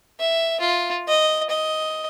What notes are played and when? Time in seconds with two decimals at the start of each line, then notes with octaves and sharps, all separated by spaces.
0.20 E5
0.60 F4
1.08 D#5
1.49 D#5